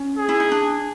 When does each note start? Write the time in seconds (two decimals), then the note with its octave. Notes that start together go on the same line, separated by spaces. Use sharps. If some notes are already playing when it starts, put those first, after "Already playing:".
Already playing: C#4
0.17 G#4
0.28 E4
0.40 D#4
0.52 D4